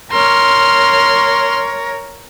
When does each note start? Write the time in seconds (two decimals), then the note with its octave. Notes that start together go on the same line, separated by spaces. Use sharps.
0.12 A#4 C#5 C6 F6